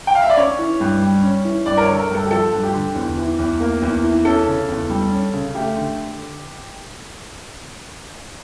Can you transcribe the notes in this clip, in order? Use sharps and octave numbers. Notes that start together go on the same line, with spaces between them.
G5
F5
E5
D5
C#4 C#5
E3
G2
G3
C#4
E3
G2 D5
A#4
C#5
D3 A4
A#4
G2 A4
G4
F3 A4
G2
G4
D3
E2
E3
E2
A#3
E2
E3
C#4 A4
C#3
E2
G3
C#4
C#3
A3 G4
D3